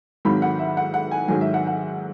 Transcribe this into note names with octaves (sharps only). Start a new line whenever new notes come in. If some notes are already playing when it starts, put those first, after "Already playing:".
G#1 G#2 D#3 F#3 B5
F#5
E5
F#5
F#5
G#5
G#2 D#3 F#3 G#5
E5
F#5
F#5